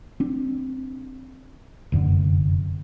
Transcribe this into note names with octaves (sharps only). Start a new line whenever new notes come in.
C4 D4
F1 F#2 D3